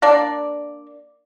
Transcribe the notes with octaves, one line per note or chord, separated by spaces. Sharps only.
A#3 D4 D5